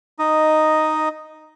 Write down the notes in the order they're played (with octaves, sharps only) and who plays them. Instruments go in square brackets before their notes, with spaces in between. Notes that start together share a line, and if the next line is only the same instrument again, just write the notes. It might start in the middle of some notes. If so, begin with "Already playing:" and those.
[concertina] D#4 D#5